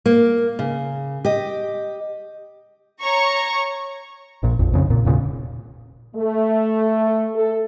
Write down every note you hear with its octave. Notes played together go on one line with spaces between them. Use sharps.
A#3
C#3
G4 D#5
C#5 A#5 C#6 C#7
A#1 A#2
A#1 F2
F2 C#3
A#2
E1 A#2 C#3
A3
A4